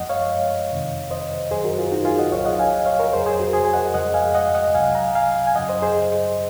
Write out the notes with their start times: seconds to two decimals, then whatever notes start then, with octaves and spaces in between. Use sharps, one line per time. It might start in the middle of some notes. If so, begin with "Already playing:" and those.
Already playing: F#2 F3 G#3 D#5 F#5
0.09 C#5 F5
0.71 F2 C3 D#3
1.11 C5 D#5
1.51 F#2 D#3 F#3 G#4 C5
1.64 F#4 A#4
1.78 F4 G#4
1.92 D#4 F#4
2.05 F4 G#4
2.19 D#5 F#5
2.32 C2 A#2 F#3 C#5 F5
2.45 D#5 F#5
2.59 F5 G#5
2.85 C#5 F5
2.99 A#4 C#5
3.13 F2 C#3 F#3 G#4 C5
3.26 G#4 C5
3.40 F#4 A#4
3.53 G#4 C5
3.65 G#5
3.73 D#5 F#5
3.94 F2 C#3 F3 G#3 D#5 F#5
4.14 F5 G#5
4.34 D#5 F#5
4.55 D#5 F#5
4.74 C2 C3 F#3 F5 G#5
4.95 F#5 A#5
5.15 F5 G#5
5.47 G#5
5.55 F#2 C#3 F#3 D#5 F#5
5.69 C5 D#5
5.82 G#4 C5